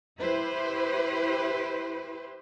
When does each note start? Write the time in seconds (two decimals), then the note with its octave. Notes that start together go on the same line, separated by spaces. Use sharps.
0.20 E4 G4 B4 C5